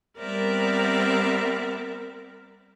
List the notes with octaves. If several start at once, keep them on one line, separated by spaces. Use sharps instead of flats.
G3 B3 C4 A#4 D5 E5